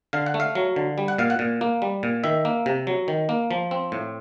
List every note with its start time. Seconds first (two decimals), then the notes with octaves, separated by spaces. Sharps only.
0.13 D3 F5
0.26 F#5
0.34 A3
0.40 F5
0.55 F#3
0.76 D3
0.98 G3
1.08 F#5
1.18 A#2 F5
1.30 F#5
1.39 A#2
1.61 A#3
1.82 G3
2.03 A#2
2.24 D#3 E5
2.45 A#3
2.66 C3
2.87 F#3
3.08 D#3
3.29 A#3
3.51 F3
3.71 C4
3.92 A2